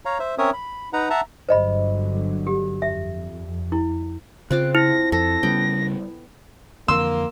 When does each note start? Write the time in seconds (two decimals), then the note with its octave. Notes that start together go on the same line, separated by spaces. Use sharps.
0.05 C#5 F5 A#5
0.19 C5 E5
0.38 C4 C#4 A#4 C#5 E5 D#6
0.53 B5
0.93 D#4 B4 F#5 A#5
1.10 E5 F#5 A5 A#5
1.49 G1 D3 F#3 C5 D#5 B5
2.47 G4
2.82 F2 E5
3.72 E4
4.51 C#3 C4 F4 D6 F#6
4.75 E4 A#6
5.12 F2 A4 A#6
5.43 C#3 G3 B3 C#4 G5
6.88 F2 D3 E3 A#3 C6 E6